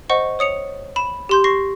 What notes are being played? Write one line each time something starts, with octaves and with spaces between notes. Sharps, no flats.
C5 D#5 F#5 C#6
C#5 D#6 C#7 F7
B5 E7
G4 C6 G6
C6 C#6 A#6 C7